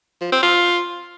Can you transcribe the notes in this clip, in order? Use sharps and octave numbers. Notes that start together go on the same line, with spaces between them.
F3
C4
F4